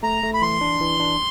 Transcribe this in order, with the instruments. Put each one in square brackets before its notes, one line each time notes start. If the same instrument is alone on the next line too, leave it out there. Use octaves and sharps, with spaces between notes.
[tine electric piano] A3 [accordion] A#5
[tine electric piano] A3
[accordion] B5
[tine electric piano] E3 [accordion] C6
[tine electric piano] D4
E3
D4